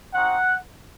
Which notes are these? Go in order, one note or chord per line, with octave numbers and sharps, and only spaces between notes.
C4 D#4 F#4 F#5